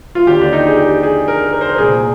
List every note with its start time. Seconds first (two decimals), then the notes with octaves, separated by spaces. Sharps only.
0.15 F4
0.27 D#2 D3 G4
0.42 D4
0.53 D#4
0.67 G#4
0.77 G4
1.03 G#4
1.28 A#4
1.53 A#4
1.61 C5
1.69 A#4
1.78 C2 A#2 G#4